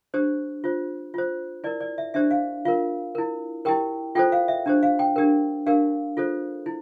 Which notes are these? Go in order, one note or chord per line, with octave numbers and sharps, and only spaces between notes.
D4 G4 C5
F4 C5
F4 C5
E4 A#4 D5
D5
E5
D4 G4 C5 E5
F5
F4 A#4 F5
E4 A#4
E4 G4 A#4 G5
F4 A4 C5 G5
F5
E5
D4 G4 C5
F5
G5
D4 G4 A#4
D4 G4 A#4 F5
F4 A4 C5
E4